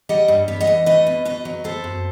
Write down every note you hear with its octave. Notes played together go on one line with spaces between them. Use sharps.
G3 D#5 F#5
G2
B3
D#5 F#5
E3
A3 B4 D#5
B2
B2 B4 D#5
F#3
B3 A4 C5
F#2